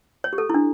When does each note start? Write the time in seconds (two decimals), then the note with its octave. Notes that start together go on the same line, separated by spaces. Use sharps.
0.24 C#5
0.33 G4
0.38 A4
0.50 E4
0.54 D4